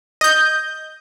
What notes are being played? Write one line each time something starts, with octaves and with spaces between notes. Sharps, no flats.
D#5 G6